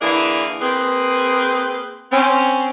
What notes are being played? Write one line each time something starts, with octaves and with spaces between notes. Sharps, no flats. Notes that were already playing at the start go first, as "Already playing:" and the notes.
D3 E3 A#3 D4 E4 G#4
A#3 C4 G#4 B4
C4 C#4